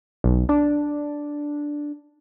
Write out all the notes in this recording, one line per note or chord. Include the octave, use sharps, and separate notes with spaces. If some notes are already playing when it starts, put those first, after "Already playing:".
B1
D4